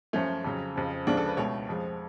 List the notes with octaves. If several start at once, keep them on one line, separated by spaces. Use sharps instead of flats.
F#2 F3 A3 C#4
F2 C#3 F#3
F2 C#3 F3
D2 C#3 F3 G#3 D4
A4
B4
C#2 B2 A3 C#5
F2 F3 G#3